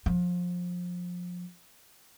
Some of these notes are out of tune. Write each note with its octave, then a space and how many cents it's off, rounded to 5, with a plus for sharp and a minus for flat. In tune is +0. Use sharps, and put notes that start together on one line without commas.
F3 +25